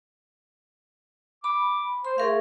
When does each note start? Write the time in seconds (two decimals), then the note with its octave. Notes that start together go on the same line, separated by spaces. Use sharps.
1.44 B5 D6
2.05 C5 C6
2.18 A3 G#4 A#4 F5